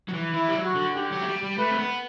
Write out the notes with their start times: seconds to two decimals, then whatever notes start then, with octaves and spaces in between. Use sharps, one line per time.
0.09 F#3
0.13 E3
0.34 E3 E4
0.49 G3
0.54 F#3
0.65 F#4
0.76 D3
0.96 D3 G4
1.12 F#3
1.22 A3
1.27 G3
1.43 G3
1.58 A3 B4
1.70 C4
1.79 B3